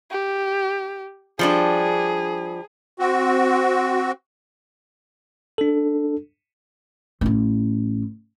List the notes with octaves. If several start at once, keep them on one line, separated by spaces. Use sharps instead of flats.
G4
F3 G3 D4 G#4
C4 F#4
D4 A4
A1 E4